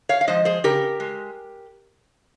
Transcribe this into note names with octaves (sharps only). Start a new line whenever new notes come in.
C#5 F5
F5
F3 G#3 C5 D#5
G#4 C5
C#3 G4 A#4
G#3